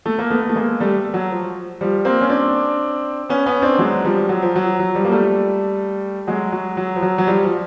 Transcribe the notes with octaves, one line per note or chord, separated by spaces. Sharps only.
A3
A#3
A3 B3
A3
G#3 A#3
G3 A3
F#3
F3
F3 G3
A#3 C4
C#4
C4 D4
B3 C#4
B3 C#4
C4 D4
F#3 G#3
F3 G3
F#3
F3
F#3
F#3
F3 G3
A#3
G3 A3
F#3 G#3
F#3
F#3
F3
F#3
F#3
F3 G3
F3